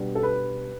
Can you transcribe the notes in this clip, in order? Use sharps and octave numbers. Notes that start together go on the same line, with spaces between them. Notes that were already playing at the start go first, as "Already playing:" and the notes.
Already playing: B2 G3 B3 D4
A4
B4